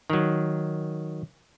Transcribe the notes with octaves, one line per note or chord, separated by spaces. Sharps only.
D#3 F#3